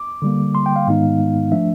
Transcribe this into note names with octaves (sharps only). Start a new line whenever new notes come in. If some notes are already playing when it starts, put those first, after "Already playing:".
Already playing: D6
D3 G3 A#3
C6
G5
F5
G#2 D#3 G#3 B3 D#4
F3 A3 D4 E5